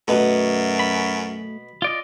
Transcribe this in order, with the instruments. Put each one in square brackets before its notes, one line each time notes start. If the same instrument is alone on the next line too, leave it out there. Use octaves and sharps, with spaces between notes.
[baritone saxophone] F#2 [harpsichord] B2 [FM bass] A3
[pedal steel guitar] B5
F4 D5 D#5